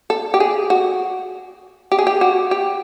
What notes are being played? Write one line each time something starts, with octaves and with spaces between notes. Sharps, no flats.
A4
G4
G#4
F#4
G4
G#4
G4
F#4
G4